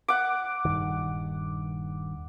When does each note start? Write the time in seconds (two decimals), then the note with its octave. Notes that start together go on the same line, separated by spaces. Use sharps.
0.08 F#5 D6
0.65 D#1 G2 D#3